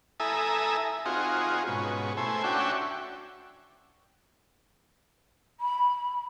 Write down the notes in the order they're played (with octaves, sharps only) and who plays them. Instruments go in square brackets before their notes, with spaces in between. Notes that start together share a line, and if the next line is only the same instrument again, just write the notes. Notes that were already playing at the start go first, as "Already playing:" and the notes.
[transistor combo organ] E4 A4 E5 G#5 A#5 D#6
C4 D#4 F4 F#4 G#4
G#2 B2 C#4
A3 E4 C5 G#5
C#4 D4 F#4 E5 G5
[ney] B5